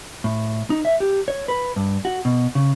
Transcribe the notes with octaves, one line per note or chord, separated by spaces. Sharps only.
A2
D#4
E5
G4
C#5
B4
G2
F#4
B2
C#3